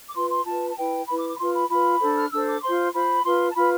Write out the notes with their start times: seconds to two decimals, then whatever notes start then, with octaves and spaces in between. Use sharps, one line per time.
0.09 D6
0.15 F4 B4 C6
0.30 C6
0.45 F4 B4 A5
0.69 A5
0.77 E4 B4 G5
1.08 E4 B4 B5
1.18 D6
1.29 D6
1.35 B5
1.39 F4 B4 C6
1.54 B5
1.70 F4 B4 B5
2.01 D4 A4 C5
2.18 F6
2.32 D4 A4 C5 E6
2.48 D6
2.63 F4 C5 C6
2.94 F4 C5 B5
3.24 F4 B4 C6
3.50 A5
3.56 F4 B4 B5